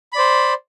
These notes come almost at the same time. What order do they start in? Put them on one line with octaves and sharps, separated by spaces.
B5 D5 C5